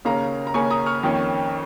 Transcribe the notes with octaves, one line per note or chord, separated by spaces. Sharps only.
D#2 C#3 A#3 C#4 F5 A#5
A#5
D#2 C#3 A#3 C#4 G#5 C#6
A#5 D#6
C#6 F6
F2 D#3 A#3 C#4